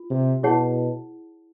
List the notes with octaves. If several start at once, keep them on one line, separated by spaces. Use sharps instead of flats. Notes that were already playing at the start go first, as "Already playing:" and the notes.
Already playing: F4
C3
B2 E4 G#4 C#5 F#5 A5